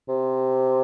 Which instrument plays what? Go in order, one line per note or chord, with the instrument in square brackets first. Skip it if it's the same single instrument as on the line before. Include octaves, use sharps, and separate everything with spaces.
[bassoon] C3